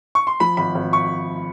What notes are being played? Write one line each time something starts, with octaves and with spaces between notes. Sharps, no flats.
C#6
C6
F3 B5
G#1 B5
G#1
C#6